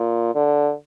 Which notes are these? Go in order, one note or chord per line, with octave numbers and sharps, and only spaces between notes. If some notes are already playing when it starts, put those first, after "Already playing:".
Already playing: A#2
D3